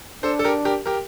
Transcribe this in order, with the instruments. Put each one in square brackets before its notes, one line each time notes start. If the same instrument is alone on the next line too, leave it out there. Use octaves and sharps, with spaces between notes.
[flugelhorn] D4 [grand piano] A4 C5
[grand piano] A4
G4 A#4
G4 A#4
G4 A#4